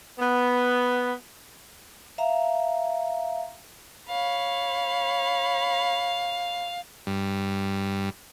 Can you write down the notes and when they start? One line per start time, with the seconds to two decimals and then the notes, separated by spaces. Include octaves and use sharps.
0.19 B3
2.18 E5 F5 A#5
4.09 C#5 F5 B5
7.07 G2